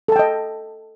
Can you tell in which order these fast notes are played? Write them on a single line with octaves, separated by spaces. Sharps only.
A4 A5 G5 D#5